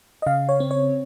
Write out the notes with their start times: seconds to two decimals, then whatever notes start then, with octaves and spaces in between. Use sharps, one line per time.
0.22 D#5
0.26 C#3 F5
0.49 C#5
0.60 C4
0.71 C#5